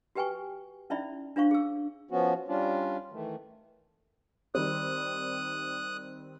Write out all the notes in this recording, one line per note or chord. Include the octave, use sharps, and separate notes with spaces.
F#4 G4 B4 G5 G#5 C#6
C#4 D#4 E4 D5 E5 B5
D4 F4 C5 F5 C#6
G#4 E6
F3 B3 C#4 F#4
G3 C#4 D4 F4
D#3 E3 A3
D#3 G3 C4 D#6 F#6